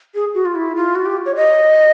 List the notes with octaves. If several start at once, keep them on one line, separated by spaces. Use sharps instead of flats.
G#4
F#4
F4
E4
F4
F#4
G4
C#5
D#5